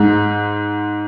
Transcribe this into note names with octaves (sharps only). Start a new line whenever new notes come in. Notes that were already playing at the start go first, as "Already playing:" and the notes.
Already playing: G#2